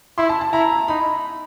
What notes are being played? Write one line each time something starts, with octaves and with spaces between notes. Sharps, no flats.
E4 C6
A5
A5
E4 A#5
D#4 B5